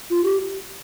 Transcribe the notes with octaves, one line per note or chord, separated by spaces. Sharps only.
F4
G4